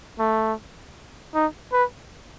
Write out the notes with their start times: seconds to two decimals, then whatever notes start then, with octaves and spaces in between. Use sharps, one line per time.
0.19 A3
1.34 D#4
1.72 B4